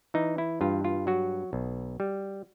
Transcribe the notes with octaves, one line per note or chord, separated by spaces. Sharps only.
E3 D#4
E4
G2 F4
F4
F#3 F#4
B1
G3